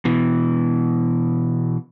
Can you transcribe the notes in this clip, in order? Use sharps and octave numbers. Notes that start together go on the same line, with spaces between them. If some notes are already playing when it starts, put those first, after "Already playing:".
B2 E3